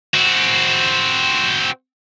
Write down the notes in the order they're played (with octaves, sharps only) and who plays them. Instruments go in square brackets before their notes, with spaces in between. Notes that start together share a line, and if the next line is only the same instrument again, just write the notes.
[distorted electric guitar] C4 F#4